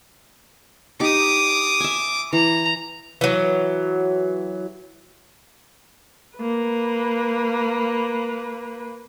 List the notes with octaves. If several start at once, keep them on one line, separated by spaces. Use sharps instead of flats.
D#4 G4 D6 D#6
E5 G#5
E3 A#5
E3 F#3
A#3 B4